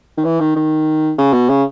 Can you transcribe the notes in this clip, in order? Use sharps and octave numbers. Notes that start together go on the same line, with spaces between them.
D#3
E3
D#3
D#3
C#3
B2
C#3